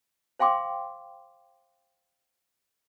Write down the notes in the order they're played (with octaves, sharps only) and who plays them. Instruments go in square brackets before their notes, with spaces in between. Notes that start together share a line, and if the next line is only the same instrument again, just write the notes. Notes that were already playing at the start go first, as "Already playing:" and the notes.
[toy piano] C5 F5 G5 C6 D6